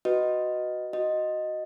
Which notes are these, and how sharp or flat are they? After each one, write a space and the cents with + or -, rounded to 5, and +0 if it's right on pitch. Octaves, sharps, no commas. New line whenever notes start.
F#4 +0 B4 +0 D#5 +0
F#4 +0 D#5 +0